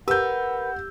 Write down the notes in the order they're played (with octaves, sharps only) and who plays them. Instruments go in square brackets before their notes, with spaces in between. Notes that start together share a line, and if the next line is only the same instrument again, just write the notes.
[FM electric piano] G4 [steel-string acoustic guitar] A#4 B4 [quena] F#5 [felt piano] E6 G6